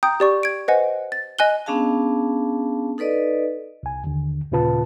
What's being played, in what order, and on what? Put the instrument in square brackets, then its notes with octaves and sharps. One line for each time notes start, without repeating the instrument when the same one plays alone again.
[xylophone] G5 A#5 D#6 G6
G4 D5 C#6
G#6 D7
B4 C5 D#5 F#5 G#5
A6
D#5 G#5 F#6 G7
[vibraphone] B3 C#4 D4 G#4 F5 A5
D#4 A4 B4 D5 D#5
[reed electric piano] C2 G#5
D#2 D3
D#2 A#2 C#3 F4 B4 A5